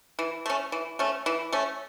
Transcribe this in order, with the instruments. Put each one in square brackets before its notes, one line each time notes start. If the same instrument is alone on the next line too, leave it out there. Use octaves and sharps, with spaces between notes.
[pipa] E3
A3 C#4
E3
A3 C#4
E3
A3 C#4